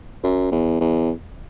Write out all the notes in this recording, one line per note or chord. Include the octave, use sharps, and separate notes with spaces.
F#2
E2
E2